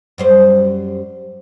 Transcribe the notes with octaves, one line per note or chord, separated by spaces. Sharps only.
F#2 G3 C5